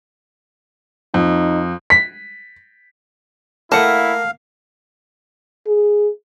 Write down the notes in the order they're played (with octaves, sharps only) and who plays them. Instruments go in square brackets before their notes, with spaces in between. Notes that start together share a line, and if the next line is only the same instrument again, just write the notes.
[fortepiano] F2 [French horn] D#4
[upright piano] B6
[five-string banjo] A3 F#5 A5 [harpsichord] A#3 [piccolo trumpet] E4 [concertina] F5
[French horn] G#4